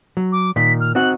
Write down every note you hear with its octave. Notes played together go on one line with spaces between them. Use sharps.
F#3
D6
A#2 D#3 B6
F6
C4 D#4 F#4 F#6